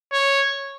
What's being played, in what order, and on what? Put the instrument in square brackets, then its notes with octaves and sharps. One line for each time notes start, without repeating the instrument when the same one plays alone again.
[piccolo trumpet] C#5